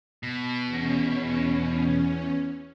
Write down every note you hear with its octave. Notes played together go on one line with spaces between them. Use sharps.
B2
E2 C#4